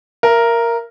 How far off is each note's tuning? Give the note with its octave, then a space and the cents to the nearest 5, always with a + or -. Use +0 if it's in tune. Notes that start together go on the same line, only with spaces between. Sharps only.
A#4 +0 E5 +35